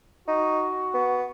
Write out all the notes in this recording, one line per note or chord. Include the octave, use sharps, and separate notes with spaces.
D#4 F#4
B3